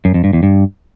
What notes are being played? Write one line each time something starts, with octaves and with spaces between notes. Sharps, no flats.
F#2
F2
G2
E2
G2